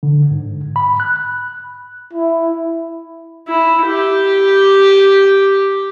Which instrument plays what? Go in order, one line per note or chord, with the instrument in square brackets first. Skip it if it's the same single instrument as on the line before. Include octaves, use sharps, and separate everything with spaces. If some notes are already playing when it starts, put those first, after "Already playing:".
[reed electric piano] D3
G#2
B5
F#6
[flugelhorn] E4
[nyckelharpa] E4
G4